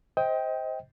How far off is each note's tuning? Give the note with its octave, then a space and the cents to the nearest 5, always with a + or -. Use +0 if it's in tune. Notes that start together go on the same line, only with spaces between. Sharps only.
C5 +0 D#5 +30 G5 +0